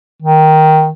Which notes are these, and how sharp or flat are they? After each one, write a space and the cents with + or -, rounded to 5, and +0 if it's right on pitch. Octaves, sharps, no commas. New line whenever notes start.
D#3 +5